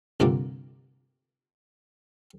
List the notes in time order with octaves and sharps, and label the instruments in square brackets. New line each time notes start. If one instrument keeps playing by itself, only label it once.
[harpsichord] C2 G2 A#2 D3 A#3